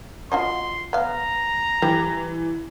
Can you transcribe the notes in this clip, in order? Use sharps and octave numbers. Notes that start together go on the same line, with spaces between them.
F4 F#4 D#5 C6
B3 F5 A#5
E3 G3